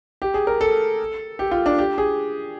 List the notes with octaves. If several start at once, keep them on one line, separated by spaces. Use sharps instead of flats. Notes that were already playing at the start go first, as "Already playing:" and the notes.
G4
G#4
A#4
A4
G4
F4
D4
G4
G#4